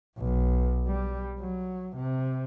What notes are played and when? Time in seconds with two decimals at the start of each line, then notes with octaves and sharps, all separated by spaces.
0.17 B1
0.87 G3
1.40 F#3
1.96 C3